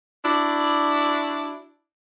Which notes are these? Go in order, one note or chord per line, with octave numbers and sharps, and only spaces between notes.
D4 E4 F#4 D5